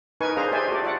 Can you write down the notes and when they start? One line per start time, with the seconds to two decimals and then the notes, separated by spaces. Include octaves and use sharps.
0.21 D#4 A#4 B4 G#5 C#6
0.37 D4 G#4 C5 F5 A#5
0.52 G4 C5 D5 E5 G#5
0.68 F#4 G4 A4 D5
0.83 F4 D5 E5 F#5